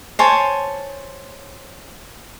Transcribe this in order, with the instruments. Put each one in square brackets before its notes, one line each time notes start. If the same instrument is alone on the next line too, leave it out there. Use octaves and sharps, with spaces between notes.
[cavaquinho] C5 C#5 G#5 A5